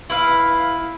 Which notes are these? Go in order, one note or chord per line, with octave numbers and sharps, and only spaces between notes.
E4 B4 F5